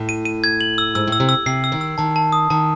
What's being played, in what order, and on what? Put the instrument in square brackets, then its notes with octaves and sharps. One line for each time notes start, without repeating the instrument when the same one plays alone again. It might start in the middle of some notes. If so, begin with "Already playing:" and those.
Already playing: [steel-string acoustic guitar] A2
[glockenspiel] D#7
D#7
G#6
F#7
E6
[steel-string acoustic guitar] G#2 [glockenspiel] E6
[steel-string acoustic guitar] A2 [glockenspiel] E6
[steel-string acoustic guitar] C3
[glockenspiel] E6
[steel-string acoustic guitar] C3 [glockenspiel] C7
[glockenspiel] E6
[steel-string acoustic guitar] D#3
[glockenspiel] E6
[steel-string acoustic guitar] D#3 [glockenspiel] A5
[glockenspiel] A5
D#6
[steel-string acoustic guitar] D#3 [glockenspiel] A5